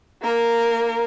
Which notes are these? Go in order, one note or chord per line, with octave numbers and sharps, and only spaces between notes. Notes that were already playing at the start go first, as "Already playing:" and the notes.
A#3 A#4